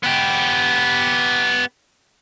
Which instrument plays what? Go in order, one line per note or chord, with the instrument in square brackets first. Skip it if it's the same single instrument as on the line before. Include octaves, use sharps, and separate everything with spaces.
[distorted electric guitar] B3 G4